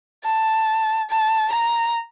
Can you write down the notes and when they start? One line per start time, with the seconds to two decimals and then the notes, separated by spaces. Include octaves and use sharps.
0.24 A5
1.10 A5
1.53 A#5